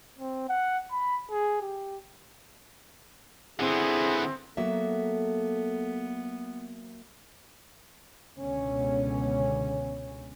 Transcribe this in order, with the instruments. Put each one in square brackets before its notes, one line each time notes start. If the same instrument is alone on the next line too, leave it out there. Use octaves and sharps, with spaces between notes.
[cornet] C4
F#5
B5
G#4
G4
[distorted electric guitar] D3 B3 [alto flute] C4 [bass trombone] E4 [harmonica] G#4
[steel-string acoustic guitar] F#3 A#3 E5 [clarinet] B3 [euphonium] A4
[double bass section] C#2 B2 D3 B3 C#4